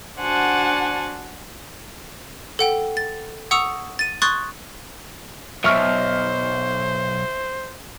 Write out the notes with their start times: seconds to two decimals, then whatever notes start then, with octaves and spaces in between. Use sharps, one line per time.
0.18 D4 F#4 C5 F#5 G#5 A5
2.59 A4 F#5 G5
2.97 A6
3.51 F#5 C#6 D#6 E6 C#7 F7
3.99 A6 D#7
4.22 C6 C#6 D#6 F#6 G#6 A6
5.64 B1 F2 C5 E5 C#6 F6